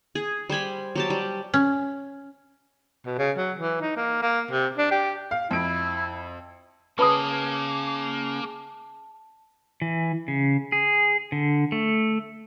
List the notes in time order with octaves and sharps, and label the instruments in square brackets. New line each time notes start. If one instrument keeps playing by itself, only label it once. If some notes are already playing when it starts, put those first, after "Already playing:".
[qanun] G#4
G3 C5 G#5 B5
F#3 G4 A5
G3
[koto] C#4
[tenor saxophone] B2
C#3
F#3
E3
D#4
A#3
A#3
C3
D4
G4
[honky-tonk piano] F5
[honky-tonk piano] F2 D7 [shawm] E4
[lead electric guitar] A#3 [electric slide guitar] C#4 G#4 [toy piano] B4 B5 D#6 [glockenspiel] A5
[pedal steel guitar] E3
C#3
G#4
D3
A3